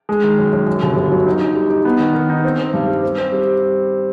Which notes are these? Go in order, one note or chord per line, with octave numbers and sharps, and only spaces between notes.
G#3
D#3
F#2
F#2
F#2
G1
G1
F#3
D#4
D#4
G3
D#4
B3
D#3
D#3
D#4
C4
C4
G2
G3
C4
C4
G3